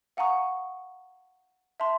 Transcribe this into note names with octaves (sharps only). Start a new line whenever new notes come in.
F5 F#5 G#5 A#5 C#6 D#6
E5 A5 C6